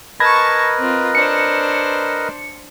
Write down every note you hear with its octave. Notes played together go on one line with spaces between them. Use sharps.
A#4 B4 D#5 A5 B5 C#6 G#6 A#6
C4 F4
D4 C5 C#7